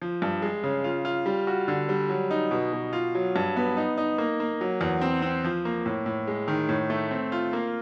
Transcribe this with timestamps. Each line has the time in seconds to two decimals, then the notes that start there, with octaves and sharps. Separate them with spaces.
0.02 F3
0.22 G2
0.42 G#3
0.63 C#3
0.84 F4
1.05 F4
1.26 G3
1.47 F#4
1.68 D3
1.89 G3
2.09 F#3
2.31 D#4
2.51 B2
2.73 B2
2.93 F4
3.15 F#3
3.36 G2
3.56 B3
3.77 D#4
3.98 D#4
4.18 A#3
4.40 A#3
4.61 F#3
4.81 E2
5.01 C4
5.22 C4
5.44 F3
5.65 A#3
5.86 A2
6.06 A2
6.27 G#3
6.48 D#3
6.69 A2
6.90 A3
7.11 C4
7.32 F4
7.53 A#3